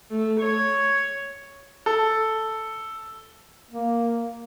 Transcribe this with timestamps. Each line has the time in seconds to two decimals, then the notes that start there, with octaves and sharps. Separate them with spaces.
0.11 A3
0.40 C#5
1.86 A4
3.71 A#3